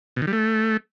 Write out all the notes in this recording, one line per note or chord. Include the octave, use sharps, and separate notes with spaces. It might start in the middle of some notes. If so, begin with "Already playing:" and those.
B2
D#3
G3
A3